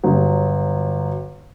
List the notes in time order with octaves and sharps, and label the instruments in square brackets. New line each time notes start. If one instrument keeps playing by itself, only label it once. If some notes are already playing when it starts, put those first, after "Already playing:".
[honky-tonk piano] G1 F#3